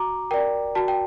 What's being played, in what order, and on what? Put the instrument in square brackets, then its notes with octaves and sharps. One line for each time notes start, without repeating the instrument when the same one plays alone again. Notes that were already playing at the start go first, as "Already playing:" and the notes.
Already playing: [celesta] F#4 A#5 D6
A#4 D5 G5
F#4 A5
G5